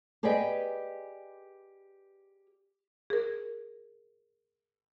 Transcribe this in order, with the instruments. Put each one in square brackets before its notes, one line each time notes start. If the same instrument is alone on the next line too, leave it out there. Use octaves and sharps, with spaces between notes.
[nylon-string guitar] G4 G#4 B4 D5 D#5 G5
[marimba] G#4 A#4